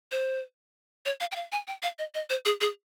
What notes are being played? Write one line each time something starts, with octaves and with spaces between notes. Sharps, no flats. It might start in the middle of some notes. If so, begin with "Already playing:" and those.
C5
C#5
F5
G5
F5
G#5
G5
F5
D#5
D#5
C5
G#4
G#4